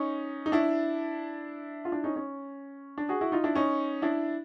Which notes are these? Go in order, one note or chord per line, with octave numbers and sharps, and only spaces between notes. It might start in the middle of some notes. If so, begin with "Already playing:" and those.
Already playing: C#4 D#4
D#4
D4 E4
F4
D4 E4
C#4 D#4
C#4
D4
F#4 G#4
E4 F#4
D#4 F4
D4 E4
C#4 D#4
D4 E4